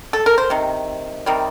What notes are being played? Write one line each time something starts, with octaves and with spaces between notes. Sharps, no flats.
A4
A#4
C5
C3 D#3
C3 D#3 G3